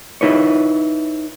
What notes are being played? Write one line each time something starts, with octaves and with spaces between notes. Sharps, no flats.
D#4 E4 B4 C#5